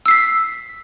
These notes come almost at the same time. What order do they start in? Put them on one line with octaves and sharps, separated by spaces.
E6 C7 B6